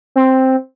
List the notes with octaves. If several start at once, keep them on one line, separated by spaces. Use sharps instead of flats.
C4